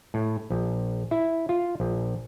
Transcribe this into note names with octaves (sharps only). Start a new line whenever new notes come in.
A2
A#1
E4
F4
A#1